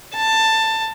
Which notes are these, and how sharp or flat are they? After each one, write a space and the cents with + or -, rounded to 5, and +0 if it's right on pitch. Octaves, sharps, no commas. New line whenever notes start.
A5 +15